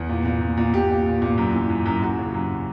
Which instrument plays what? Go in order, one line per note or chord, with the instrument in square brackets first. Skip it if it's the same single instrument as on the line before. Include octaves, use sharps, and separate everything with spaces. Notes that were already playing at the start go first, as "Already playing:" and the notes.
Already playing: [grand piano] E2 B4
A#2
A#2
A#2
A#2
A#2 G4
A#2
A#2
A#2
F#2
E3
F#2
F#2
F#2 F#4
C#3
F#2